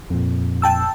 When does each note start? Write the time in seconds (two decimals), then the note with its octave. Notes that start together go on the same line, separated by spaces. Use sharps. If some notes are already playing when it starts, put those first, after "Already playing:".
0.10 F2 A#2
0.62 G5 A5 E6